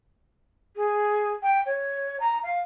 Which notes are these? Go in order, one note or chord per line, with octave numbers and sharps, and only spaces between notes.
G#4
G5
C#5
A#5
F5